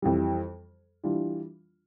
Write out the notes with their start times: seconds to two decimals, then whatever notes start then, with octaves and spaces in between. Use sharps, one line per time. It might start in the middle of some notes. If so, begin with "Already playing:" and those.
0.02 F2 E3 G3
1.04 E3 G3 D4 F4